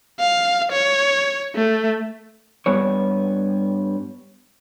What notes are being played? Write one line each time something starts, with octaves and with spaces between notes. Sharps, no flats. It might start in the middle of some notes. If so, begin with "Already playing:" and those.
F5
C#5
A3
G2 G3 B3 C#5